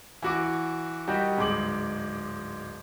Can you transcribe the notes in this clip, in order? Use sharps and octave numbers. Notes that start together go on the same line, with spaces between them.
E3 F#4 D6
D#3 G3 D#4 F#4 G4
D1 G#2 G#3 D6 F#7